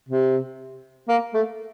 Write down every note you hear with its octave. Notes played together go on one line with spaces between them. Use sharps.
C3
A#3
A3